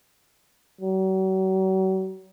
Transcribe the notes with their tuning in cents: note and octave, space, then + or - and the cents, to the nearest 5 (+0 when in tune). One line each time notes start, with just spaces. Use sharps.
F#3 +40